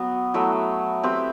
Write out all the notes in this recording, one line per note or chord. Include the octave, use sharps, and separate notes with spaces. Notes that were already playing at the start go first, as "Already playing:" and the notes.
Already playing: F#3 B3 F#4
F#3 A3 E4
C4 G4 B4